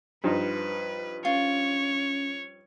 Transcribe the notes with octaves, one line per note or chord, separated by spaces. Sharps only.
G2 F3 D#4 B4
C#4 F4 C#5